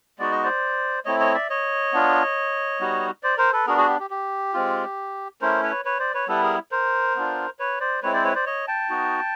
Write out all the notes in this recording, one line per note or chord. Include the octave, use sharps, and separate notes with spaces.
G#3 B3 D#4 F#4 D5
D#5
C5 D5
A3 C4 E4 C#5 D#5
C#5 D#5
D5 E5
C#5 D#5
B3 D4 F4
G3 B3 D#4 F#4
C5 D5
A#4 C5
A4 B4
B3 D4 F#4 G#4 A#4
F#4 G#4
G4
G4
G4
G#3 C4 F4
A3 C#4 E4 A#4 C5
B4 C#5
B4 C#5
C5 D5
B4 C#5
G3 B3 E4 A4 B4
G#4 A#4
A#4 C5
B3 D4 F4
B4 C#5
C5 D5
G#3 C4 E4 B4 C#5
C5 D5
B4 C#5
C5 D5
C#5 D#5
G5 A5
B3 D#4 F#4